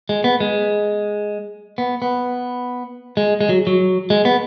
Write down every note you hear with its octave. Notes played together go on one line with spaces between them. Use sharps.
G#3
B3
G#3
B3
B3
G#3
G#3
F#3
F#3
G#3
B3